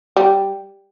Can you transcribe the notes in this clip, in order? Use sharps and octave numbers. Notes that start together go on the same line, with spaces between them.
G3